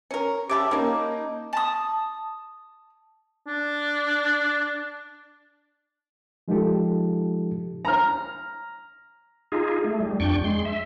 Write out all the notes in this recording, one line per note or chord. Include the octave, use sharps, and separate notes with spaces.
C#4 A#4
C#3 G4 E5 A5 B5 D6
A#3 C#4 D#4 A#4
A5 D#6
D4
F3 G#3 D#4 F4 G4 A4
A#5 F6
D#4 F4 G#4
A3
G3
F2 D4 G5 C#6
G#3 C6
E5